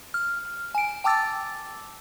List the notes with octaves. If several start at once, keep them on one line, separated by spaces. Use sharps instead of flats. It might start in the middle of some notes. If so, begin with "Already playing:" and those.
F6
G#5 D7
G5 A5 D6 E6 A6